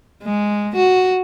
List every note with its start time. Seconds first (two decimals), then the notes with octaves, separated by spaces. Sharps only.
0.23 G#3
0.76 F#4